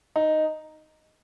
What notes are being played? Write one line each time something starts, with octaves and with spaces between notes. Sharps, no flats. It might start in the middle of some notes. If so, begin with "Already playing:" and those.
D#4